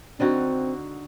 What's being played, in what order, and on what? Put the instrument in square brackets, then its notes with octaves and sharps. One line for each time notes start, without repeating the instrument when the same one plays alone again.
[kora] D3 D#4 F#4 [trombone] C4